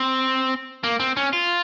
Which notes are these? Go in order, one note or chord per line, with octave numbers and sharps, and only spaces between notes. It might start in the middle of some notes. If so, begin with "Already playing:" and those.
Already playing: C4
A#3
C4
C#4
F4